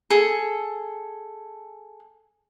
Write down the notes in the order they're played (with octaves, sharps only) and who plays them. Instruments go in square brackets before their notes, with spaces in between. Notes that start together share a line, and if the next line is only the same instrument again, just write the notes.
[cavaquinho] G#4 A4